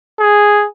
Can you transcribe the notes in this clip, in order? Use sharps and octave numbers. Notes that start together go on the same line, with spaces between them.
G#4